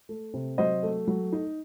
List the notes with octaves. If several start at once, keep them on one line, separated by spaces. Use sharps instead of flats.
A3
C3
F#3 C5 D#5
A3
F#3
D#4